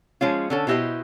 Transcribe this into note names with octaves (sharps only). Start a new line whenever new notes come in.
F3 G#3 C#4 F4
D3 C#4 A4
B2 B3 E4 G4 C5 D#5